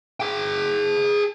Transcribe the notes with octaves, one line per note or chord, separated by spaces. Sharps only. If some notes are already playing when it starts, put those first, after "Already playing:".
G#4 G5